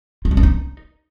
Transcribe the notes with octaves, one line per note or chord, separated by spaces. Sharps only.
F4
G3
C#4
D#4